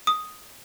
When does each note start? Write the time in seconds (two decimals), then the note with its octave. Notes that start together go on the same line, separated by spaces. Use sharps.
0.07 D#6